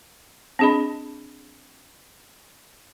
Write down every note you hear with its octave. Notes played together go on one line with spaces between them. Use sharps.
C4 D4 G#4 D#5 B5